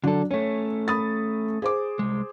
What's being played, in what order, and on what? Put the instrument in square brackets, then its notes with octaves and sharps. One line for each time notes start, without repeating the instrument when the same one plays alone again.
[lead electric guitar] D3 A4 [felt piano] F#3 D4
[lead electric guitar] A3 C#4 [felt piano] C#5
[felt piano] B5 D#6 A6
G#4 C5 D6
[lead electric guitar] C2 G#3